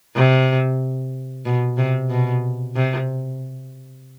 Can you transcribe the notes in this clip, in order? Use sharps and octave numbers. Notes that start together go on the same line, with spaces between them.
C3
B2
C3
B2
C3